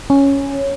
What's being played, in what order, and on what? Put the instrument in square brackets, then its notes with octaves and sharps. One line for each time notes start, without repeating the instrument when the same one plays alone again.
[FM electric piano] C#4